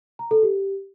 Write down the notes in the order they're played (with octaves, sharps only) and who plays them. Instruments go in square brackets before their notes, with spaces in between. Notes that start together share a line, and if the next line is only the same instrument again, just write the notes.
[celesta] A#5
A4
G4